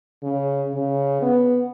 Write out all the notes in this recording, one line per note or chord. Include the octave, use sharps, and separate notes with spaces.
C#3
C#3
B3